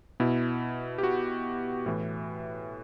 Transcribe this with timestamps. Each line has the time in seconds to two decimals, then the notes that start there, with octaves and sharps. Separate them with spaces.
0.20 B2 E4
0.98 G4
1.03 F#4
1.86 A2 E3